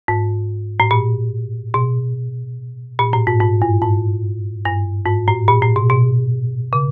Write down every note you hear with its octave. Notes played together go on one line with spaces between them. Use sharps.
G#2
A2
A#2
B2
A#2
A2
G#2
G#2
G2
G#2
G2
G#2
A2
A#2
A2
B2
B2
C#3